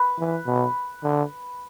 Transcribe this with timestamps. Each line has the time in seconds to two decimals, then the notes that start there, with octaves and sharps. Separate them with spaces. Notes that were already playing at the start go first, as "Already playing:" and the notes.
Already playing: B4
0.19 E3
0.46 B2
1.03 D3